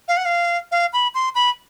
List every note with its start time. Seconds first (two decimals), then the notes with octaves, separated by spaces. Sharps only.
0.08 F5
0.17 F#5
0.25 F5
0.72 F5
0.93 B5
1.14 C6
1.35 B5